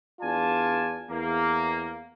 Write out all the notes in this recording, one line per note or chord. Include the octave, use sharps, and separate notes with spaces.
E2 D4 F4 D5 G#5 A5
E2 A#3